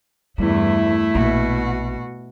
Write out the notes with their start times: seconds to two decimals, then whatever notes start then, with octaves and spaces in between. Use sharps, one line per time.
0.38 E2 G2 G3 A3 E4
1.15 A#1 B2 F#4